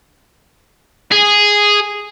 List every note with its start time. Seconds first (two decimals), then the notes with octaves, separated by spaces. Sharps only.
1.12 G#4